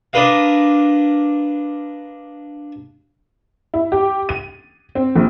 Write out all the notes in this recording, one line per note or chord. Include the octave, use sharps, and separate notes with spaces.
D4 A#4 B4 D#5 F5
E4
G4
D#7
C4
A#1